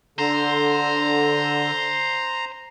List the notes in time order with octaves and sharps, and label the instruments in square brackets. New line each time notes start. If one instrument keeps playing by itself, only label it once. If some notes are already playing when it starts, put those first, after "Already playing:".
[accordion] D3 [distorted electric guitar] C5 [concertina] A#5